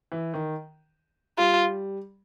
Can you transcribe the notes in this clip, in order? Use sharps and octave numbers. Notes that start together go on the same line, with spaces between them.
E3
D#3
G3 F4